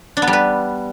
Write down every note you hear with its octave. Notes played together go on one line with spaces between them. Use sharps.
D4
B3
G3
B4